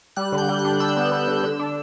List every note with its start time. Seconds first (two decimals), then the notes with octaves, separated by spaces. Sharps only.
0.16 G3 F#6
0.32 D3
0.38 G6
0.49 G3
0.59 F#6
0.65 D4
0.80 D4 E6
0.96 B3
1.12 B3
1.28 D3
1.43 D3
1.59 D4